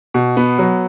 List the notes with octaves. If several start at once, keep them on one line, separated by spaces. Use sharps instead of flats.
B2
B3
F#3